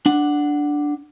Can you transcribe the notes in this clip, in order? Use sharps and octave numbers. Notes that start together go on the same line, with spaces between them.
D4 F#5